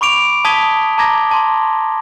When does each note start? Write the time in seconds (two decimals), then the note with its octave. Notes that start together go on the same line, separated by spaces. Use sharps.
0.01 B5 C#6 D6 D7 F7
0.45 A5 D#6 G#6 B6 F7 G7
0.98 A5 A#5 D6 G#6 A#6 G7
1.31 A5 C6